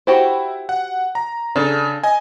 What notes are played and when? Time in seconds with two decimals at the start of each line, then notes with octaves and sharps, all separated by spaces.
0.07 E4 F#4 G4 C5
0.69 F#5
1.15 A#5
1.56 C#3 D4 A4
2.03 D#5 G#5